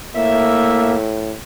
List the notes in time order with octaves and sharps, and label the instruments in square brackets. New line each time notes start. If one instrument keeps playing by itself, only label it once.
[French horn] A2 [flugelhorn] A#3 [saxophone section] E5